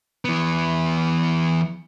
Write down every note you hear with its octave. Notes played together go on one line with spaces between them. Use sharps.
E3 B3